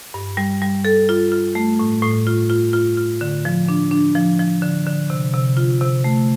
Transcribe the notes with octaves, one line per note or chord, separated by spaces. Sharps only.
G2
G3
G3
A4
F4
F4
A3
A2
A2
F4
F4
F4
F4
D3
F3
D4
D4
F3
F3
D3
D3
C3
C3
F4
C3
A3